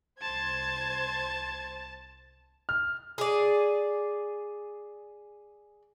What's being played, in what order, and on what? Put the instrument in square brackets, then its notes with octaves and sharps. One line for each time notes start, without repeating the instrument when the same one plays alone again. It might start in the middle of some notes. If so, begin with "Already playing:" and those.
[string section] C2 C5 G#6 [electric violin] A5
[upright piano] F6
[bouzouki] G#4 D5